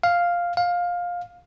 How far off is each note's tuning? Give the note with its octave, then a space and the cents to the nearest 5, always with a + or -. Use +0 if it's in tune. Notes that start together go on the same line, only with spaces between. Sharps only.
F5 +0
F5 +15